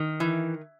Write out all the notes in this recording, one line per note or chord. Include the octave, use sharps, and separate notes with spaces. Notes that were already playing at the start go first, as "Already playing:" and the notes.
Already playing: D#3
E3